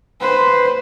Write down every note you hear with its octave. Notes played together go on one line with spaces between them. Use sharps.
B4 C5